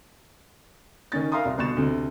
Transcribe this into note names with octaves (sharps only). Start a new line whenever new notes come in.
D#3 C#4 A6
A#4 E5 F5 A#5 C6 D#6
C2
G1 B2 C6 C#6 A6 E7
D2 C3